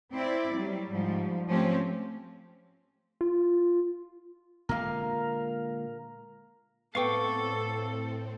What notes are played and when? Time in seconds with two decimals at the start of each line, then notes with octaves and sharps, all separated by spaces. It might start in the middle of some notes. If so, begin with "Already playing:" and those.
0.13 C4 E4 D5
0.55 F#3 G3
0.90 G#2 F3 G3
1.49 F3 A3 C4 C#4 G4
3.21 F4
4.69 A#2 D3 G#3 A#4 F5
6.95 A2 B3 C4 A4 F5 G5 C#6 D6